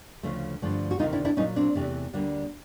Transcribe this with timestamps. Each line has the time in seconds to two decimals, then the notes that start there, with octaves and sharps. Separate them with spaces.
0.23 D2 C#3 F3 A3
0.62 G2 D3 F3 A3
0.91 F#4
0.99 D2 C3 D#3 F#3 A#3 D#4 F4
1.13 D4 E4
1.25 D4 E4
1.37 A#2 F#3 A#3 C#4 D#4
1.56 C4 D4
1.75 E2 C3 E3 A3
2.13 D2 D3 G3 A#3